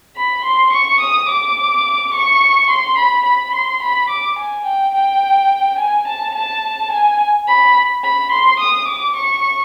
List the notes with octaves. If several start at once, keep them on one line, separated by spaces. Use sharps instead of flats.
B5
C6
C#6
D#6
D6
C#6
C6
B5
B5
C6
B5
D6
G#5
G5
G5
G#5
A5
A5
G#5
B5
B5
C6
D#6
D6
C#6